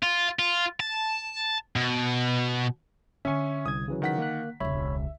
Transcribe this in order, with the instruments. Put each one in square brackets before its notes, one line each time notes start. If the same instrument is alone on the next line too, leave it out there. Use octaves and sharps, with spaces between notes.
[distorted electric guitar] F4
F4
A5
B2
[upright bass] D3 [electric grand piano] C#4 G#5 [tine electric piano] E5 C#6
[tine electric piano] C2 G#6 [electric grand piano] D#6
[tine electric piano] C#3 E3 F#3
[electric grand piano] D#3 F#5 B6
[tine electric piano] A#3 F#6
[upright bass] E1 C#2 [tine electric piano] C#5 B5 [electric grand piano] E5